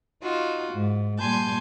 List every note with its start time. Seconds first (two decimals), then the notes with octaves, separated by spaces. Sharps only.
0.22 D#4 F4 F#4
0.74 G#2
1.20 A#2 G3 G#5 A5 C6 G6